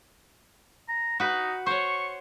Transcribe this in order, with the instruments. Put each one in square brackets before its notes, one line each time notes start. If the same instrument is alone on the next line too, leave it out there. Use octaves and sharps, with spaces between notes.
[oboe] A#5
[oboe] D#4 [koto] F#4 B4
[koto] C5 C#5 [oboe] C#6